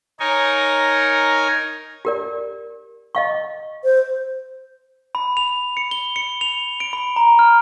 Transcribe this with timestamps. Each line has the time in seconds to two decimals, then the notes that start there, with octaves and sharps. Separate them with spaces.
0.20 D#4 A#4 C#5 G#5
2.05 G4 A#4 D5
3.15 D#5 F5 C#6
3.84 C5
5.15 B5
5.37 F7
5.77 C#7
5.91 G7
6.16 C#7
6.41 F7
6.80 D7
6.93 B5
7.16 A#5
7.39 F6